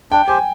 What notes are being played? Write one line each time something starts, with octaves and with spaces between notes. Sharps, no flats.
D4 G5
G4 C5 G#5